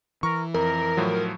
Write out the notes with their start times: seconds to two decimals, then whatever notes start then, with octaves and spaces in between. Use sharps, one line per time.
0.23 E3 A#4 C#6
0.54 F2 A#4 A#5
0.97 A2 F3 F#3